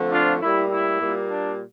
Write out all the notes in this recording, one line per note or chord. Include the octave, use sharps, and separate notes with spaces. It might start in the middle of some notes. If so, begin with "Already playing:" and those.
Already playing: D3 F3 A3 C4
D4 F4
A2 G3 A#3 E4
E4
A#2 G3 A#3
D4